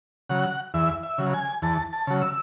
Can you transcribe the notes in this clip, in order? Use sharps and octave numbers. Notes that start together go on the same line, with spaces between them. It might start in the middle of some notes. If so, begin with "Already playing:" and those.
C#3 F#3 F#5
E2 E5
E5
C#3 F#3
G#5
E2 A5
A5
C#3 F#3
E6